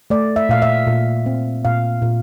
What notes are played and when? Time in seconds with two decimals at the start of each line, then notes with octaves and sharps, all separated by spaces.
0.10 A3 D5
0.36 E5
0.49 A#2 F5
0.62 E5
0.87 A#2
1.26 C4
1.65 A#2 F5
2.02 A#2